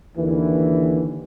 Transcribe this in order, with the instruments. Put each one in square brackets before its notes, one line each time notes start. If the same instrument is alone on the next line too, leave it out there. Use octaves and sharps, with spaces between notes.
[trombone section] D#2 D3 E3